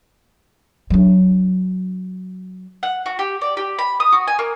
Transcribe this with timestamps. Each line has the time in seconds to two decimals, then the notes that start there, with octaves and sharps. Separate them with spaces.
0.90 F#3 D4
2.83 F#5
3.06 F#4
3.19 G4
3.41 D5
3.57 G4
3.79 B5
4.00 D#6
4.12 F#4
4.27 G#5
4.39 A#3